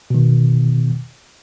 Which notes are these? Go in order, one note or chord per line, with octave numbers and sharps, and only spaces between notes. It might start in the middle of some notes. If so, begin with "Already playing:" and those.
B2 D#3